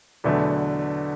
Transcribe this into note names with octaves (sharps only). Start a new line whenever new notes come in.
E2 B2 D3 F#3 A3